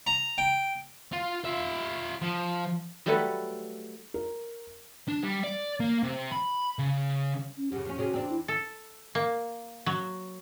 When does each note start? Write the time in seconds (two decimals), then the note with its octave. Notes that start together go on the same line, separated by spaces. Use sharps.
0.07 A#5
0.38 G5
1.13 F4
1.45 F4 E5
2.22 F3
3.06 F#3 G3 A3 A4 B4 F#5
4.14 A#4
5.08 D4
5.24 G3
5.44 D5
5.80 A#3
6.03 C3
6.31 B5
6.79 C#3
7.57 C#4
7.72 F#2 C#3 G4
7.85 F2 C#4
7.98 C3 C#4 F#4 G#4
8.12 E2 C4 D4
8.30 E4
8.48 A4
9.15 A#3
9.86 F#3